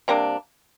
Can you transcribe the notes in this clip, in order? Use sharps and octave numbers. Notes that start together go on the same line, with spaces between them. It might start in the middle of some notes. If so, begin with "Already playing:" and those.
C3 G3 A#3 D4